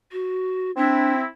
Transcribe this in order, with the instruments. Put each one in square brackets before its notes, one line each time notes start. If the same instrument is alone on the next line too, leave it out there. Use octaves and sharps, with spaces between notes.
[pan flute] F#4
[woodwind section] C4 E4 [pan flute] D4